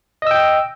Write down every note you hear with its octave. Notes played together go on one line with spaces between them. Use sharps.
D#5 G5 E6